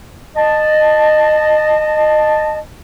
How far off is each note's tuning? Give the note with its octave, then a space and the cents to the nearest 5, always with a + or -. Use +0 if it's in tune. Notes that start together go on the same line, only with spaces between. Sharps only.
D#5 -20 A5 +0